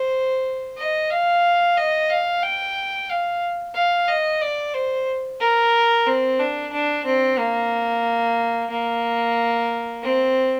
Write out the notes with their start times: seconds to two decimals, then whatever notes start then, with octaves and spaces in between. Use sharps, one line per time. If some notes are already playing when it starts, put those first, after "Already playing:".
Already playing: C5
0.78 D#5
1.10 F5
1.77 D#5
2.10 F5
2.43 G5
3.09 F5
3.74 F5
4.08 D#5
4.41 D5
4.74 C5
5.40 A#4
6.07 C4
6.40 D4
6.73 D4
7.05 C4
7.38 A#3
8.71 A#3
10.03 C4